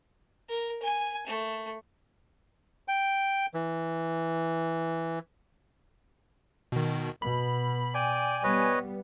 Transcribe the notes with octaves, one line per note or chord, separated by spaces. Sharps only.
A#4
G#5
A3
G5
E3
B2 D#3
B2 B5
D5 G5 G#5
G3 B3 B4 C#5 D#5